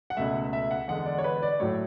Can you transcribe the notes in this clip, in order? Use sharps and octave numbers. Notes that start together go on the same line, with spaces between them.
F#5
C#2 B2 A3 E5
E5
F#5
E2 D3 G#3 F#5
D5
C#5
B4
D5
A2 F#3 A3 C#5